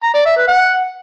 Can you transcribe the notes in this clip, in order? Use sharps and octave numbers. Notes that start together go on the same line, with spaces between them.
A#5
D5
E5
B4
F#5